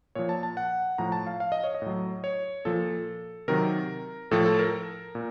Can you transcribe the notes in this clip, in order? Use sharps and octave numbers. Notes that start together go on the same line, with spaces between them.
A#2 F3 C#5
A5
A5
F#5
A2 F3 A#5
A5
F5
F5
D#5
C#5
D#5
A2 F#3
C#5
A#2 F3 A4
C3 D#3 F#3 A#4
A2 F3 A4
A4
A#4
A#2